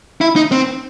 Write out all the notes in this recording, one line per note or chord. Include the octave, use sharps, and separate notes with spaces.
E4
D#4
C4